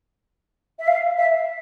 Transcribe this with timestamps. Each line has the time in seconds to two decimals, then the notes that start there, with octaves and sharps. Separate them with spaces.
0.79 E5
0.87 F5
1.17 E5